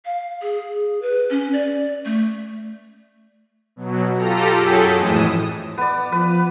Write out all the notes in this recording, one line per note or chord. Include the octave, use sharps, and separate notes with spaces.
F5
G#4
B4
C#4
D5
A3
B2 F#3
F4 G4 A4 A#5
F#2 F#3 G#4 A4 G5 B6
F2 A2 E3 G#3 D#6 E7
B3 D5
F3 B4